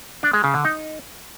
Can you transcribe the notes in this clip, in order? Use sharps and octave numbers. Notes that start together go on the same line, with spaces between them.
D4
G#3
C#3
D3
D#4